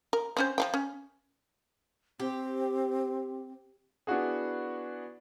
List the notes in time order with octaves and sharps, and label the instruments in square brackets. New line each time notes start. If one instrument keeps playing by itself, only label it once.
[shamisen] A#4
C4 C#4 C5
F3 F5 G5
C#4
[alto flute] C4 [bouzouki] G4
[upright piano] B3 D4 E4 F#4 G#4